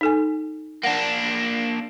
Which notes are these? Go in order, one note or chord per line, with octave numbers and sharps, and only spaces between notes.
D#4 A4 G#5
A#3 D4 F#5